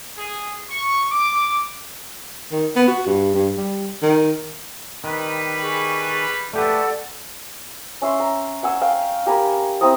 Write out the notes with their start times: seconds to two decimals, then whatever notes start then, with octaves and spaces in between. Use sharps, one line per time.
0.17 G#4
0.69 C#6
1.10 D6
2.52 D#3
2.76 B3
2.88 F#4
3.06 G2
3.34 G2
3.57 G3
4.02 D#3
5.04 D#3 G3 B4
5.63 G#4 C#6
6.53 A3 G4 A4 B4 D5 F#5
8.02 C#4 E5 C6
8.20 A#5
8.63 F#5 G#5 E6
8.82 F5 G5
9.26 G4 A#4 G#5 B5
9.81 C4 E4 A#5 D#6